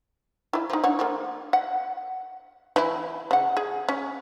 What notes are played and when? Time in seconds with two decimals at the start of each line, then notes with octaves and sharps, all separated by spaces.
0.53 F3 E4
0.70 F3 D#4
0.84 D4 C#5 F#5
0.99 F3 A#3
1.53 F#5
2.76 E3 E4
3.31 C#3 F#5
3.57 G#4
3.89 C#4